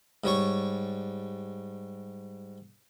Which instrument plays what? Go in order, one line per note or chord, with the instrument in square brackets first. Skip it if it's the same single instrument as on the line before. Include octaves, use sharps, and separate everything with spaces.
[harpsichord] G#2 G3 C#5 C#6